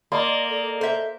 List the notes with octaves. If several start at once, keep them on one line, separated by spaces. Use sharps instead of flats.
A#3 D5 D#5 C6
A4
A4 C5 E5